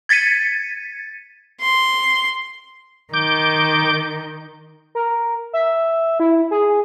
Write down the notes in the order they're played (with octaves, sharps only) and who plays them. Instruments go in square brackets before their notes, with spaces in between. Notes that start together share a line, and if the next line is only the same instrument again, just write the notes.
[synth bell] G#6 A6 B6 C#7 D#7
[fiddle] C6
[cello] D#3 [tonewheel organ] D6 G6
[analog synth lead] A#4
E5
E4
G#4